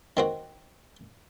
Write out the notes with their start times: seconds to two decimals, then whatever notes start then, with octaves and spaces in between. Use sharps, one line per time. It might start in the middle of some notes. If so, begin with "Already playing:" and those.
0.17 D#3 C4 F#4